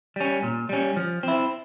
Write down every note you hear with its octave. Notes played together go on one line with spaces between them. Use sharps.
G3 C#4
A#2
G3 C#4
F3
C4 E4